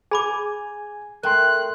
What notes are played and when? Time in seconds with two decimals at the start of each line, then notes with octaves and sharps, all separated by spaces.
0.11 G#4 G#5 B5 D6
1.23 A3 A#4 G5 C6 F#6